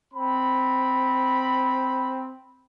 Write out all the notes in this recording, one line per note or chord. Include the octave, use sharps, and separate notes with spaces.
C4 B5